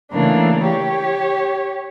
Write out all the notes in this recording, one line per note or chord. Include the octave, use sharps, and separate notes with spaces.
C#3 E3 A3 A#3 D4
G4 C#5